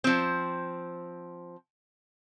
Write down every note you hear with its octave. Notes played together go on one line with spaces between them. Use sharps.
F3 C4